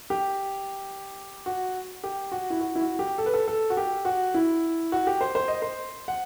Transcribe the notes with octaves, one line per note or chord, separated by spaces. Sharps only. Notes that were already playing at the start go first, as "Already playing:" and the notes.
G4
F#4
G4
F#4
E4
F#4
E4
F#4
G4
A4
B4
A4
A4
F#4
G4
F#4
E4
F#4
G4
C5
C5
D#5
C5
F#5